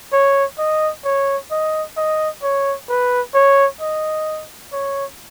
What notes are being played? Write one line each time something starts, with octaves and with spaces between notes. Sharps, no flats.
C#5
D#5
C#5
D#5
D#5
C#5
B4
C#5
D#5
C#5